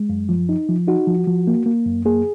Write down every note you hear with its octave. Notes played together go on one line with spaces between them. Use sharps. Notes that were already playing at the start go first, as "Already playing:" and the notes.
Already playing: G#3
F#2
F3
D#4
F3
D#4 F#4
F3
F3
A#3
A#3
F#2
A#3 G#4